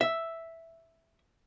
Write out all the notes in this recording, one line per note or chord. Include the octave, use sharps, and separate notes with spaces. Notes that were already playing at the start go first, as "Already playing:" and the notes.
E5